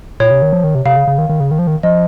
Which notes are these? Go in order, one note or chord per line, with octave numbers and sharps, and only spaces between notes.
A#2 C#5
C3
D#3
F3
D#3
C3
C3 F5
C#3
C#3
D#3
D#3
C#3
D#3
F3
D#3
F3 D#5